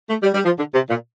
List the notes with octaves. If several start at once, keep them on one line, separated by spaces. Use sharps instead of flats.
A3
G3
G3
F3
D3
C3
A#2